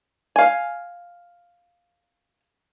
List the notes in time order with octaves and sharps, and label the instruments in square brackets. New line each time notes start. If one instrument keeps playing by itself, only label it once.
[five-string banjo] F5 G#5